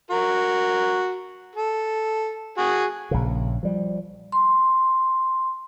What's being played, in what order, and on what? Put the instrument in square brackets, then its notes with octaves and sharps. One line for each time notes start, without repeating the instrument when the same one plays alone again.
[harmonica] F#4 A#4
A4
F#4 G#4
[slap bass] A#1 C#3
F3 G3
[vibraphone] C6